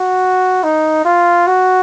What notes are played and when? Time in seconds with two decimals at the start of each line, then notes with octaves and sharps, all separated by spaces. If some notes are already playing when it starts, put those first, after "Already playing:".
Already playing: F#4
0.63 D#4
1.05 F4
1.47 F#4